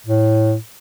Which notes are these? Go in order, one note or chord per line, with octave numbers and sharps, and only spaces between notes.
A2